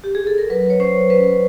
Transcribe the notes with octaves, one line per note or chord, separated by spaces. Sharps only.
G4
G#4
A4
A#4
F#3 B4
C#5
C#4 C5
C#4 B4